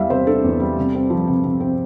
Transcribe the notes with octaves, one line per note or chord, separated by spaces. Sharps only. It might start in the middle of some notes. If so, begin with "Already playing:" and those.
Already playing: E2 E3 G3 E5 F5
C3 C5
D4 A4
E2
G3
C3
C4
F3
C3
C3
C4